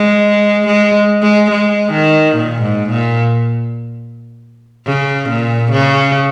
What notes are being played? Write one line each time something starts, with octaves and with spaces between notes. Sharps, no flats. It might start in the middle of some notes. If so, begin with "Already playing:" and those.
Already playing: G#3
G#3
G#3
G#3
D#3
A#2
G#2
A#2
C#3
A#2
C#3